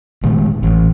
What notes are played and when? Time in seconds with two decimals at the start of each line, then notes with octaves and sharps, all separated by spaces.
0.23 A#2 D#3 G#3 A3
0.63 A1